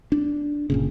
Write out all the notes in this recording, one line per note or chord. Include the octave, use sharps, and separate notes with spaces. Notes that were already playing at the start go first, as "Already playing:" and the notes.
D4
G1 A#2 C#3